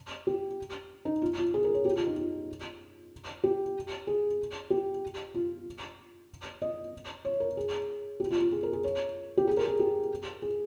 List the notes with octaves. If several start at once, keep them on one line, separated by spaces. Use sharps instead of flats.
G4
D#4
F4
F4
G#4
A#4
C#5
G4
F4
D#4
F4
G4
G#4
G4
F4
D#5
C#5
A#4
G#4
G4
F4
F4
G#4
A#4
G#4
C#5
G4
G#4
A#4
G#4
G4
G#4